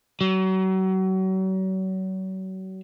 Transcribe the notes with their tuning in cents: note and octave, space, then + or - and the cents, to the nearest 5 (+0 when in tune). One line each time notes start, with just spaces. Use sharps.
F#3 +35